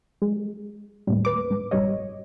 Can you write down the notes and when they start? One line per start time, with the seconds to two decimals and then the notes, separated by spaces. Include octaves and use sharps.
0.22 G#3
1.07 D#2 A2 G3
1.25 B4 D6
1.50 G#2
1.71 G1 G#2 B2 G3 C#5 D#5